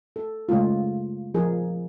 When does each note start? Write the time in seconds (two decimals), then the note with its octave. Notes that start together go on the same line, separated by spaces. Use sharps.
0.16 A4
0.49 C#3 G#3 A3 F4
1.34 F3 G#4 A#4